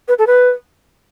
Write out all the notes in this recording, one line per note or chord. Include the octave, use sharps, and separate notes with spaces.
B4
A4
B4